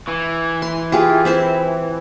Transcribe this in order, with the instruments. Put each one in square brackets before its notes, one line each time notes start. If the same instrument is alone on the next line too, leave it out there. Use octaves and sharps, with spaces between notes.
[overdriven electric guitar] E3
[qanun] C6
F4 G4 G#4
C4 E4 C5